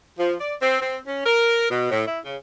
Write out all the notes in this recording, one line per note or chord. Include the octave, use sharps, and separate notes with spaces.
F3
D5
C4
C4
C#4
A#4
B2
A2
E4
C#3